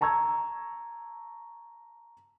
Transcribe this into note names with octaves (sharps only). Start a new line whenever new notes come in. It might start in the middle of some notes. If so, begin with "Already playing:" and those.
A5 A#5 C#6 E6 G#6